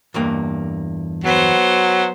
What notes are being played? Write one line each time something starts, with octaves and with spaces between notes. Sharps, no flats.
E2 G2 A#3
F#3 B3 C5